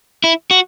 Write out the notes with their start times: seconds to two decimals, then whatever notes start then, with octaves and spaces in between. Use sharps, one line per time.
0.24 E4
0.51 F#4